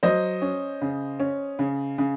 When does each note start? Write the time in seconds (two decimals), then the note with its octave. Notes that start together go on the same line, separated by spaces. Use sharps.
0.03 F#3 C5 D#5
0.42 C#4
0.82 C#3
1.20 C#4
1.59 C#3
1.98 C#3